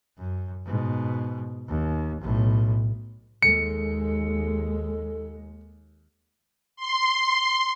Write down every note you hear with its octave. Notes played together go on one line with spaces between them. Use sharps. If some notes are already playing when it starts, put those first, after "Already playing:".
F#2
G#2 B2
D#2
B1 A2
D#2 G#3 A4 C#7
C6